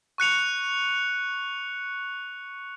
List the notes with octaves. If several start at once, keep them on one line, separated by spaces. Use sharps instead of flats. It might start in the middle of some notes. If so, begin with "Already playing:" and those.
C#6 F#6 C#7 F7